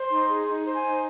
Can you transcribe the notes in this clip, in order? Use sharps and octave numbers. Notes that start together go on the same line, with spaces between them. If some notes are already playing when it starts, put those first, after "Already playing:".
Already playing: C5 C6
D#4
G#4
D#4
C5
G#5
D#4